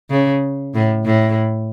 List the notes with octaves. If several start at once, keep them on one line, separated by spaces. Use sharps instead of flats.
C#3
A2
A2